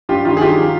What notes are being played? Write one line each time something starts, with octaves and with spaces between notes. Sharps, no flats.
G2 F4 G4
D#3 F4 G4
G#4
F#3 F4 G4
F#3